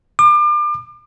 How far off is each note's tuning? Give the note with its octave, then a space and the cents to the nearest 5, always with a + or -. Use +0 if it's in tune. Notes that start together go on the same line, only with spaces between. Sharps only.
D6 +35